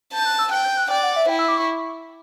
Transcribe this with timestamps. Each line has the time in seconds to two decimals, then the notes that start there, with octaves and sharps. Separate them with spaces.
0.13 A5 G6
0.26 F#6
0.39 E6
0.51 G5 F#6
0.65 G6
0.77 F#6
0.91 D5 G5
1.03 F#5
1.16 E5
1.29 E4 G5
1.39 E6
1.48 D6
1.57 C#6